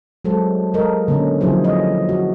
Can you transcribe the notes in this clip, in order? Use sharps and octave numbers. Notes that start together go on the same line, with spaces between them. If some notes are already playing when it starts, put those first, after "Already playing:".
F#3 G#3 A4 C5
G#3 A4 A#4 D#5
D3 A#3 C#4
D3 F3 F#3 E4 G#4 C5
D#5
F#4